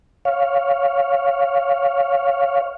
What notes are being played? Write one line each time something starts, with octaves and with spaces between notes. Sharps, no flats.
C#5 F5